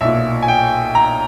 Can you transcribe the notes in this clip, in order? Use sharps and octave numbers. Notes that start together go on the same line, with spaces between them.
B1 A#2 E5
G#5
G5
A#5